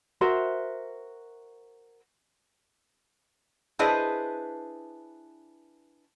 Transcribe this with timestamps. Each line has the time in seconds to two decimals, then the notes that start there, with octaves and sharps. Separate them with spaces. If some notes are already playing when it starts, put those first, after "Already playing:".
0.21 F#4 A#4 C5 E5
3.79 D4 E4 G#4 B4 C5 D#5